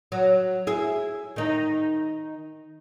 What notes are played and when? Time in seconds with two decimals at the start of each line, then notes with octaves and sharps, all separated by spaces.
0.12 F#3
0.67 E4 G#4 E5
1.36 D#3 D#4